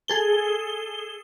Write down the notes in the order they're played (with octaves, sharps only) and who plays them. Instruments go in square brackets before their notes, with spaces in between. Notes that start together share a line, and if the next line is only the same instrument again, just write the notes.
[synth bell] G#4 A4 G7